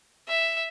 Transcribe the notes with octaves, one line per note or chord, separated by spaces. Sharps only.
E5